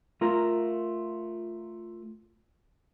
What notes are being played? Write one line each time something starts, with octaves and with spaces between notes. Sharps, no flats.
A3 F4 A#4 A#5